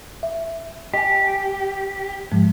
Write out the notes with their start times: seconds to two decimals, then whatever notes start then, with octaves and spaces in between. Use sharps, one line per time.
0.23 E5
0.94 G4 D#5 G#5
2.32 G#2 F3 G#3